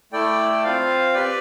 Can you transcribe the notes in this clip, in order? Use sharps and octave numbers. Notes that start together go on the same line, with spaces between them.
A3 E4 A4 D5 G5
C4 F4 C5 F5
G4 B4 D5 G5